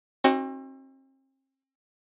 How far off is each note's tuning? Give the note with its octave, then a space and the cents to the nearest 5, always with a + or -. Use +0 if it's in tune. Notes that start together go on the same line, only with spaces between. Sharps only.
C4 +40 D#4 +0 F#4 +15